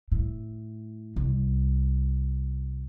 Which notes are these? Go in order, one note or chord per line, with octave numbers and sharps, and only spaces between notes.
A2
C2